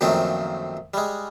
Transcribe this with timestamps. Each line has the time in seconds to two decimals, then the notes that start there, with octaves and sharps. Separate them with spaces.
0.01 F#2 A#2 D#3 F3 A3 C4
0.94 G3 G#3